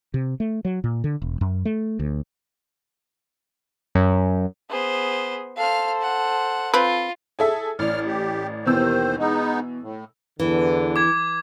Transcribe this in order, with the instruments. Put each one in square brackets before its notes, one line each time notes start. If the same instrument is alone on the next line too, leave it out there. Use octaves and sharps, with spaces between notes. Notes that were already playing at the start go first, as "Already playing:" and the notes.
[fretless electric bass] C3
A3
F#3
A#2
D3
E1
F#2
A3
D2
[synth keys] F#2
[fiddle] B3 C5 [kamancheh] G#4
[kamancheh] A4 C5 [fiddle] F5 F6
[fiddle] F#5
[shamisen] C4 B4 [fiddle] F4
[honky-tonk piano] G#4 A4 E5
[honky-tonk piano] A1 D5 [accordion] F6
[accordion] G4
[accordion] D#2 D#3 C5 [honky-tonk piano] B2 E3 E6
[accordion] G#3 B3 D#4
A2
[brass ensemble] E2 D3 [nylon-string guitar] E3
[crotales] D6 G#6